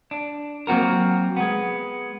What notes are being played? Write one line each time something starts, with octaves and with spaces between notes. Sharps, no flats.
D4
F#3 A#3 C4 F#4 A#4
G#3 B3